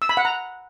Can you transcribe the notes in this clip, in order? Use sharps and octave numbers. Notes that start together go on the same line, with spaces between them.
E6
B5
F#5
A#5